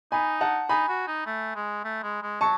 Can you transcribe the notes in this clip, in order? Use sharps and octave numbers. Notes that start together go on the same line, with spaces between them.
D#4 G#5 B5
F#5 A5
D#4 G#5 B5
F#4
D#4
A3
G#3
A3
G#3
G#3
F#3 A5 C#6